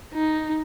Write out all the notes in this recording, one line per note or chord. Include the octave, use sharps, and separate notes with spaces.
D#4